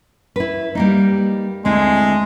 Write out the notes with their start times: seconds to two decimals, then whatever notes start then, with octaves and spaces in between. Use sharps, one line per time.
0.36 E4 B4
0.75 G3 A#3 D#4
1.65 D2 G#3 C4 E4